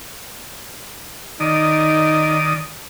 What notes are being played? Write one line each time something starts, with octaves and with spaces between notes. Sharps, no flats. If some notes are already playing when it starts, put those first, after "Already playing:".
D#3 D#4 D5 D#6